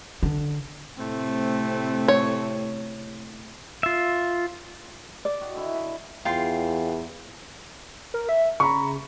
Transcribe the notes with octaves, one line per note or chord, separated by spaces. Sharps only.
D3
A2 C3 A3 C4
C#5
F4 E5
D5
D#4 F#4 G5
D3 E4
E5
E2 F4 G5 C6
A#4
E5
C#3 A#5 B5 C#6